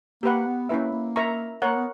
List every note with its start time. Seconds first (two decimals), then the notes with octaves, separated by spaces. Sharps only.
0.23 A#3 G4 B4 F#5
0.46 B3
0.69 A#3 C#4 E4 B4 E5
0.93 A#3
1.16 A#4 E5 A#5 C#6
1.62 A#3 A#4 C#5 F#5
1.76 B3